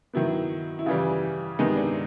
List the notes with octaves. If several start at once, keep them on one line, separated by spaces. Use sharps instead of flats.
D#3 F#3 B3 E4
E4
C#3 E3 G3 F4
C3 D#3 G#3 B3 D#4
D4